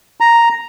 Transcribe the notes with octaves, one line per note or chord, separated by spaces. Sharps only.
A#5